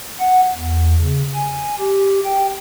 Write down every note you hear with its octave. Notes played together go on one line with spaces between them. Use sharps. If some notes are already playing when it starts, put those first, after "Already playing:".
F#5
E2
C#3
G#5
G4
G5